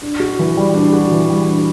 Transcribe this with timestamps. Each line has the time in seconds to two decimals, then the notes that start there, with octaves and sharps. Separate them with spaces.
0.02 D4
0.20 F#4
0.39 E3
0.57 G3
0.74 D4
0.93 F#4
1.11 E3
1.29 G3
1.48 D4